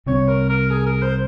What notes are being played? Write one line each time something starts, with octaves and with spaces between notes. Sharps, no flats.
C2 C3 G3 C4 C#5
A#4
A#4
G#4
A#4
C5